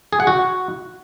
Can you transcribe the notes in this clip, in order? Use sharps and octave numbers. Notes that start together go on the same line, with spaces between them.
G#4
F#5
F#4